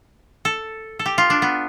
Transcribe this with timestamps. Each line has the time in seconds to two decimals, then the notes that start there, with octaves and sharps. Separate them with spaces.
0.45 A4
0.99 A4
1.06 G4
1.18 F4
1.30 D4
1.42 B3